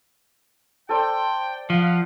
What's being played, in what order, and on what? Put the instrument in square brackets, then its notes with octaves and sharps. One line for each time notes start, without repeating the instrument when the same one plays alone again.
[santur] A4 C5 D5 [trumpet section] G5
[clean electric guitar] F3 [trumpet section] F5 F#5